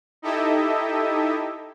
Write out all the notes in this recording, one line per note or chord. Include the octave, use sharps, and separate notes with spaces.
D#4 E4 G4 A4 D#5 E5